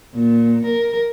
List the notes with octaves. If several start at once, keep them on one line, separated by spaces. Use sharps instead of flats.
A#2
A#4